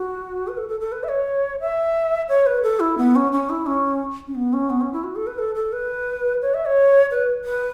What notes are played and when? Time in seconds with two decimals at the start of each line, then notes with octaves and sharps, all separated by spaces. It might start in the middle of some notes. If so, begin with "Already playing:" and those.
Already playing: F#4
0.48 B4
0.57 A4
0.69 A4
0.80 A4
0.92 B4
1.03 E5
1.08 C#5
1.60 E5
2.29 C#5
2.46 B4
2.63 A4
2.80 E4
2.98 B3
3.15 C#4
3.32 C#4
3.49 E4
3.66 C#4
4.27 C#4
4.35 B3
4.53 C#4
4.70 B3
4.81 C#4
4.93 E4
5.04 F#4
5.16 A4
5.27 B4
5.38 A4
5.55 A4
5.72 B4
6.42 C#5
6.54 E5
6.65 C#5
7.11 B4
7.45 B4